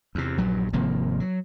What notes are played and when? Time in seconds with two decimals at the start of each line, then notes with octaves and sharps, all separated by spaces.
0.15 E2 C3
0.38 A#1 G2 F#3
0.73 G#1 C3 F3 A#3
1.20 F#3